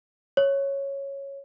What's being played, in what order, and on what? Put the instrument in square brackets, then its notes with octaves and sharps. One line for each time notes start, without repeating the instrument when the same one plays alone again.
[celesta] C#5